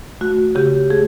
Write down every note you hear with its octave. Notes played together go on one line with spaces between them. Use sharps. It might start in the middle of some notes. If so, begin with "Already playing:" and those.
A3 F#4
C#3 G4
A3 G#4